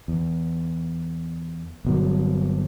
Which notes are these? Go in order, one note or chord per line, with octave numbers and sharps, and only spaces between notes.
E2
G1 B2 F#3